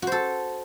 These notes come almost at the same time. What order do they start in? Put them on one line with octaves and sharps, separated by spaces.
F#4 C5 A4